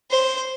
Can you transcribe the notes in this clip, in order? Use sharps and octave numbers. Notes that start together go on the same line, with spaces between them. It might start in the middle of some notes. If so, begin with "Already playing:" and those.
C5